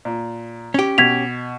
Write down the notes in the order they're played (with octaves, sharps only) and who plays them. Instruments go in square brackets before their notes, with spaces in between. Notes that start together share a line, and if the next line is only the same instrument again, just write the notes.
[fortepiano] A#2
[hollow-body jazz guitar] C#4 G4
[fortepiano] B2 [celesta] G#6 B6 F7